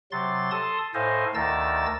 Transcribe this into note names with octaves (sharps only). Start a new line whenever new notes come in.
C3 F#3 C6 A6
A4 A5 C6 D#6
A2 A4 C5 D#5 F5 G#5
D2 D#3 A#4 A5 E6 A6